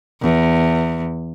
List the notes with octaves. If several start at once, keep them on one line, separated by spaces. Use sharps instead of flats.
E2